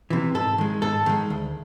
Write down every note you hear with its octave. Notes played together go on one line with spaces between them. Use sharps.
C3 E3
G#2 A4
D#3 G#3
G#2 A4
D#3 G#3
D2